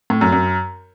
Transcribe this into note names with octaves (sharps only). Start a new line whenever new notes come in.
A2
F#2
F#2